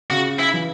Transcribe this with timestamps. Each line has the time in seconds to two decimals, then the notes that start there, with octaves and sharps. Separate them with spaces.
0.10 C#3 F#4
0.39 E4
0.53 E3